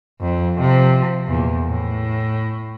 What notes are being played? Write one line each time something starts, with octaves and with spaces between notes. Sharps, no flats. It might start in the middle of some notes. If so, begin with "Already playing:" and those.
F2
C3 F3
E2 A#2
A2